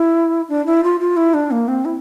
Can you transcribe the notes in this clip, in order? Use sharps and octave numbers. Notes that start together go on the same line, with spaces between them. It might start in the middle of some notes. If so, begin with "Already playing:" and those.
Already playing: E4
D4
E4
F4
F4
E4
D4
A#3
C4
E4